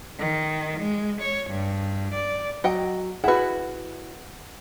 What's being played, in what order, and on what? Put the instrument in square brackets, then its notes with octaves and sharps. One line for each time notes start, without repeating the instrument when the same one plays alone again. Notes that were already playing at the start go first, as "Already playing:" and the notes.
[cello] D#3
G#3
C#5
G2
D5
[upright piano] F#3 [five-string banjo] D#5 F#5 G5
[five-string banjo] E4 F#4 [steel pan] G#4 B4 [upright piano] F#5